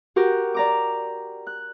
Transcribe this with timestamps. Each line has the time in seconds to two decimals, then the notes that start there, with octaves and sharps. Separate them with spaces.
0.16 F#4 G4 A#4
0.54 D5 A#5 D6
1.47 F#6